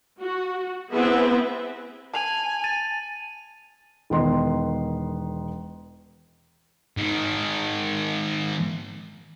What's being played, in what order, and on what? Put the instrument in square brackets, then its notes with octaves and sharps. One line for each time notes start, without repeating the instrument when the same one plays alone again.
[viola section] F#4
B3 C4 E4 G#4 B4 E5
[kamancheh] G#5 [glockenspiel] A5 F7 F#7
[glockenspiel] A6 [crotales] D#7
[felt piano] E1 D#3 B3 C6
[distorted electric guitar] G#2 D#3